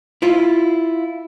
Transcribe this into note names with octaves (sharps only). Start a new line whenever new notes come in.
E4 F4